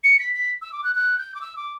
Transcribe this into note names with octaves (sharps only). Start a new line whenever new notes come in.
C#7
B6
B6
E6
D6
F#6
F#6
G6
D6
E6
D6